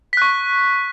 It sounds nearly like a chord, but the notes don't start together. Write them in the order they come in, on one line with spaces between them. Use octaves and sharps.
B6 F#6 C#6